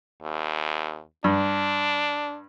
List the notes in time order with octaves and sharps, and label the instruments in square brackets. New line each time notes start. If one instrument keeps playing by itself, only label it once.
[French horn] D#2
[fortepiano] G2 [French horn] D4